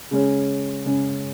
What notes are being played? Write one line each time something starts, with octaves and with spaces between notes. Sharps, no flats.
C#3 G#3 C#4
C#3 G#3 C#4